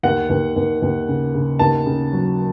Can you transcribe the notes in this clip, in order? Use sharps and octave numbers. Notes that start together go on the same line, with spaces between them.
D#2 F#5
D#2
D#2
D#2
C#3
C#3
D#2 A5
C#3
F#3